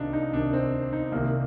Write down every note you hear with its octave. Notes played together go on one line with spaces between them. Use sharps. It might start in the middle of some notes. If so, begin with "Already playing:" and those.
Already playing: C2 C3 D#3 D4 D#4 F4
D#4
C2 C3 D#3 D4
C4
D#4
C2 C3 D#3 A#3